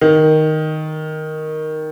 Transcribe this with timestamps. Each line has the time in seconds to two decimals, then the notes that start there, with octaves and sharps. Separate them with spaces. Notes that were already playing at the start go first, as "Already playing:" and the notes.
0.01 D#3